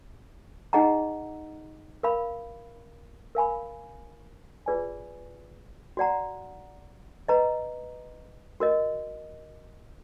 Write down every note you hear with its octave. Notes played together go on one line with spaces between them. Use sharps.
D#4 G#4 D#5 F#5 A#5
A#4 F5 B5
A#4 F5 G#5 B5
F4 G#4 B4 D5 G#5
F#4 D5 F#5 A#5
B4 D#5 A#5
F#4 A#4 D#5